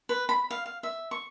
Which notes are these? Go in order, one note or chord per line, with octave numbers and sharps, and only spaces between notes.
B4
B5
F5
F5
E5
C#6